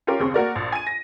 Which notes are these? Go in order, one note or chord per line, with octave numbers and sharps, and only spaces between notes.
C#4 F4 G4 A#4
F#1 D#2 C4 G#4 C#6
A#3 F#4 A#4 D5
A#1
G#5 D#7
A#6